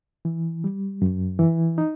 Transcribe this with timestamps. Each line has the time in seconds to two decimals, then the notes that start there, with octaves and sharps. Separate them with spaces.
0.25 E3
0.64 G3
1.02 F#2
1.39 E3
1.78 D#4